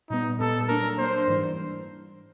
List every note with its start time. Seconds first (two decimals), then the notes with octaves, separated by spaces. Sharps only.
0.10 A#2 G3 B3 D#4
0.40 A#2 G3 B3 A4
0.69 F#3 A#3 D4 A#4
0.98 F#3 A#3 D4 C5
1.28 G#2 E3 G3